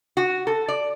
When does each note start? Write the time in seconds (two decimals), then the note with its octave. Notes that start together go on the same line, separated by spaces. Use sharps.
0.17 F#4
0.47 A4
0.68 D5